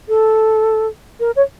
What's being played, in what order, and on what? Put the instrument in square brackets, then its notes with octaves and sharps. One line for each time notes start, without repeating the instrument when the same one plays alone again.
[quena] A4
A#4
C#5